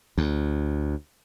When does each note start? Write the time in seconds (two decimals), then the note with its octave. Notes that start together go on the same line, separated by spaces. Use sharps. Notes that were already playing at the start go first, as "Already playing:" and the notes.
0.18 D2